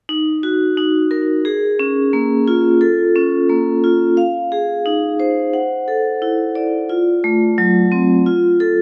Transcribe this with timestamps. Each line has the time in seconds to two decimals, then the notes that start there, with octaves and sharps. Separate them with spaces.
0.09 D#4
0.43 F#4
0.77 D#4
1.11 A#4
1.45 G#4
1.79 C#4
2.13 A#3
2.48 F4
2.81 A4
3.16 C#4
3.49 A#3
3.84 F4
4.17 F5
4.52 G#4
4.86 D#4
5.20 C5
5.53 F#5
5.88 A4
6.22 E4
6.55 D5
6.89 F4
7.24 A3
7.58 F#3
7.92 C4
8.26 F4
8.60 A4